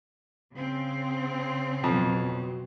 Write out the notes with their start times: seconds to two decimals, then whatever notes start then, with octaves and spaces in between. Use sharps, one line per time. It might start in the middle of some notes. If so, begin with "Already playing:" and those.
0.53 C#3 C4
1.84 F2 B2 F#3